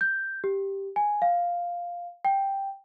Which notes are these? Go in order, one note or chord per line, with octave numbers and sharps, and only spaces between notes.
G6
G4
G#5
F5
G5